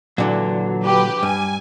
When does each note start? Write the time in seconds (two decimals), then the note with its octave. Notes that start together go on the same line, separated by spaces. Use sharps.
0.18 A#2 D3 E3 F#3
0.84 G4 B4
1.23 G2 G#5